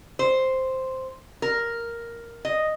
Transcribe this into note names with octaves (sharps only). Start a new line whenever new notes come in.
C5
A#4
D#5